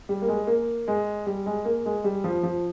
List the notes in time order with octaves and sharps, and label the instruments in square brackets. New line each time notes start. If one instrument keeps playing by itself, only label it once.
[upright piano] G3
A#3
G#3
A#3
G#3
G3
G#3
A#3
G#3
G3
F3
F3